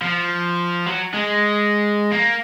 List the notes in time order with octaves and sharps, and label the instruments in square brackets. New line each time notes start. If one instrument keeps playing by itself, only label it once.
[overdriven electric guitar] F3
F#3
G#3
A#3